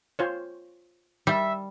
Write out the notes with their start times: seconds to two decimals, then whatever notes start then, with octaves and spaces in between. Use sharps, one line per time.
0.19 F4 C5 C#5
1.27 G3 E5